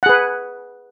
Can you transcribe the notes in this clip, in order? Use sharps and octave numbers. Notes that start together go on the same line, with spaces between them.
G#4 B4 F#5